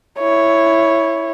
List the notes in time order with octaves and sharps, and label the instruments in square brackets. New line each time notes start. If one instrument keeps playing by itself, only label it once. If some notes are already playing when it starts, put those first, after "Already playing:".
[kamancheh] E4 C#5